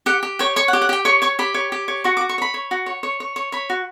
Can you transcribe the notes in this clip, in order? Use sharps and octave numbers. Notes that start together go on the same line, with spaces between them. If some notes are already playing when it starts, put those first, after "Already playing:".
G4 F#5
G4
C#5 G5
C#5 C#6
F#5
G4
F#5
G4 G5
C#5 C#6
C#5 C#6
G4 B5
C#5
G4
C#5
F#4 C#6
D6
F#4
C#6
C#5 B5
C#5
F#4
C#5
C#5
C#5
C#5
C#5 B5
F#4